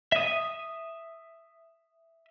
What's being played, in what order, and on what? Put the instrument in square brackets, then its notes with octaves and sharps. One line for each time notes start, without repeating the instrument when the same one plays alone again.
[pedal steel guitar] E5 D#6